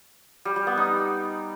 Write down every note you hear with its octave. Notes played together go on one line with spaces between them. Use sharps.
G3
G3
B3
D#4